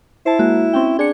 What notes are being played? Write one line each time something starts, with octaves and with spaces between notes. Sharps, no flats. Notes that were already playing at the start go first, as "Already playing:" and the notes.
E4 C5 A5
G#3 A#3 F#4
C4 C#4 G5
D4 G#4 C#7